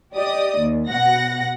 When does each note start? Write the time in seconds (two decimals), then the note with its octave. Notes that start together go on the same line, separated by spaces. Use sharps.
0.14 G4 D5 D#5 D#6
0.58 D#2
0.89 B2 F#5 A#6